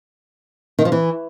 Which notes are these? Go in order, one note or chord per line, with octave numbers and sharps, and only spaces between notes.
D#3
F3
E3